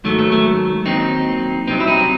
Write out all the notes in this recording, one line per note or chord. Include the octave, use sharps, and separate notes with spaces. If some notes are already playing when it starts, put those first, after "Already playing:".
G#2 D#3 F#3 A3
A3
A3
D#2 D#3 F#3 C4 D#4
C2 C3 F#3 C4 D#4
E4
C4 D#4